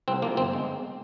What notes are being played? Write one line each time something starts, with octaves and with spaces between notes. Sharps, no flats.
C2 C4
C3 F3 A#3
G1 C4
G#3